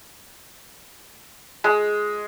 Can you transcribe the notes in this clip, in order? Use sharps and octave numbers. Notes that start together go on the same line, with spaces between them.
G#3